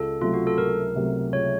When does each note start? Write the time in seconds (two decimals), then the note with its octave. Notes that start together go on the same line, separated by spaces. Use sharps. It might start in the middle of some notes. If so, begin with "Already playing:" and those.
Already playing: C#2 A4
0.21 C3 F#3 A3 F4
0.34 F#4
0.47 A4
0.58 C#2 A#4
0.96 C3 F#3 A3
1.33 C#2 C#5